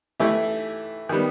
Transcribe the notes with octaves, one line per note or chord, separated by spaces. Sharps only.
E3 A3 E4 G4
D#3 G3 B3